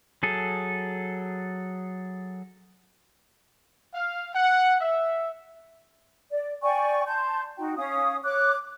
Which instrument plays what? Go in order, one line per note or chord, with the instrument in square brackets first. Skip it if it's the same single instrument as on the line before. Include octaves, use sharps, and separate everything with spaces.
[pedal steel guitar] F#3 G#4 A4
[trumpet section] F5
F#5
E5
[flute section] D5
D5 G5 G#5 C#6
A5 C6 G6
D#4 F#4 G5
C#4 F5 D#6
C#5 D6 F#6